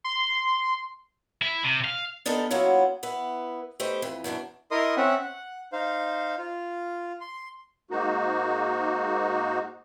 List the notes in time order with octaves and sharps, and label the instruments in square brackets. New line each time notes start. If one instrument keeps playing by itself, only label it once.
[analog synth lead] C6
[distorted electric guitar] E4
C3
F5
[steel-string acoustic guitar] B3 D4 D#4 G4 A4 A#4
F#3 A#3 B3 C#4 E4 F4
B3 E4 B4
A3 D#4 G4 B4 C5
F2 E3
F#2 B2 E3 D4
[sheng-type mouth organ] E4 A#4 D#5 C6 D#6
C4 C#4 E5 F#5
F#5
D#4 C5 F5
F4
C6
[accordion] G#2 A#3 D#4 F#4